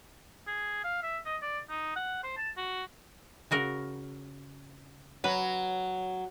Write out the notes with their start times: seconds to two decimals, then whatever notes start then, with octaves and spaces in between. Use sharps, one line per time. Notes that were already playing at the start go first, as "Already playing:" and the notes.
0.47 G#4
0.84 F5
1.03 E5
1.26 D#5
1.42 D5
1.70 D#4
1.96 F#5
2.24 C5
2.37 A5
2.57 F#4
3.51 C#3 F#4 A#4
5.24 F#3 B4